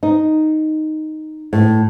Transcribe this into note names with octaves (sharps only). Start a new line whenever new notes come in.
D#4
A2